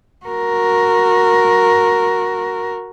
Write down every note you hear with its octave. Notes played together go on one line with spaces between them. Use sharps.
F#4 A#4